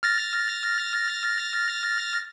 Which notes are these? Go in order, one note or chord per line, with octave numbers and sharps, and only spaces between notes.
F6 A6 A#6